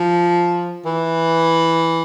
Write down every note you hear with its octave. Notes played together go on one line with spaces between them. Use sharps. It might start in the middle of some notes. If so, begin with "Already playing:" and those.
Already playing: F3
E3